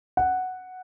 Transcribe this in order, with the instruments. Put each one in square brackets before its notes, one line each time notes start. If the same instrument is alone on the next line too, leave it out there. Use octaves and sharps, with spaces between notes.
[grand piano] F#5